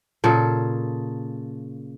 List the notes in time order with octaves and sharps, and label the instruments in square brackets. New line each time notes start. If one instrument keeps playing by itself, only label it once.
[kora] A#2 C#3 A4